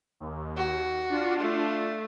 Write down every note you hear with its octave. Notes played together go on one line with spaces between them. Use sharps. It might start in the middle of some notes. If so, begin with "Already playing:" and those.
D#2
F#4
D4 F4
A3